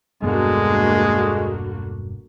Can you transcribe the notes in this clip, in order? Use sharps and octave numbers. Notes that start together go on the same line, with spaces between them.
E1 G2 D3 G#3 A#3 B3 F#4